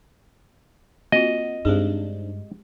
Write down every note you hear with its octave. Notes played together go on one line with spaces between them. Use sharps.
A#3 C4 F4 F#4 D#5
G2 G#3 C4 D4 D#4 G4 G#4